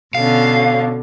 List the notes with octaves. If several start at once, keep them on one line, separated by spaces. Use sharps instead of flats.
B2 D3 C#4 F5